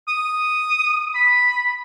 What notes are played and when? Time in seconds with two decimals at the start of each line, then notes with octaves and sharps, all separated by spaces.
0.08 D#6
1.15 B5